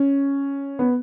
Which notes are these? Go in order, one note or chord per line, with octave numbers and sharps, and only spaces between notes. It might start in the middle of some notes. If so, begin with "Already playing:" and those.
Already playing: C#4
B3